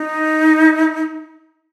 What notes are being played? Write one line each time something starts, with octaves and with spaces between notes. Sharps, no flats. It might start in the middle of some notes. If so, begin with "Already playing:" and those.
Already playing: D#4